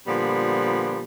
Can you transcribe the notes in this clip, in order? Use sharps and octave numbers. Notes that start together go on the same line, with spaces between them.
A#2 D3 F3 G3 B3